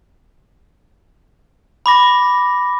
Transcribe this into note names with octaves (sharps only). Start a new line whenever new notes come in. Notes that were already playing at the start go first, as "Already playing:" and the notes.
B5 D6 A#6